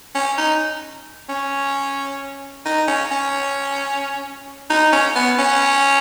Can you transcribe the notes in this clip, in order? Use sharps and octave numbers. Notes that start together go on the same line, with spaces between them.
C#4
D#4
C#4
D#4
C#4
C#4
D#4
C#4
B3
C#4